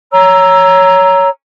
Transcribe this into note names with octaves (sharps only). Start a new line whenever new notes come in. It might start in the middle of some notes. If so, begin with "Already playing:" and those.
C#5 A#5 E6